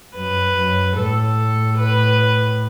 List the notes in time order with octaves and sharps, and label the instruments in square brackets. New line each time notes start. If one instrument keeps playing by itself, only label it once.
[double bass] F#2 [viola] B4
[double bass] F#2
[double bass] A2 [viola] A4
[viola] B4